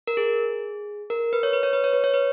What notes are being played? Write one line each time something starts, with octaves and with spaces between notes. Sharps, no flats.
A#4
G#4
A#4
B4
C#5
B4
C#5
B4
C#5
B4
C#5
B4